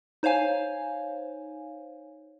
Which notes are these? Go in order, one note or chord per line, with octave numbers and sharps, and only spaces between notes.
D#4 C5 C#5 F5 G#5